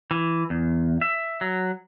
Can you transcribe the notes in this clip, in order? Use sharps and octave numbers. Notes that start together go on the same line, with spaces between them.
E3
E2
E5
F#3